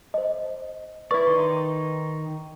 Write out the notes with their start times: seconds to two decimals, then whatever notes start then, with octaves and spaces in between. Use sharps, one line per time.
0.14 C5 D#5
1.11 E4 B4 D5 C#6
1.27 D#3 D#4 C6